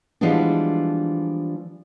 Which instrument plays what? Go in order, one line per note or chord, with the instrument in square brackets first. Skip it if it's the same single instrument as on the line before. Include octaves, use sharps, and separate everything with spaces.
[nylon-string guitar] E3 F3 G3 G#3 B3 D4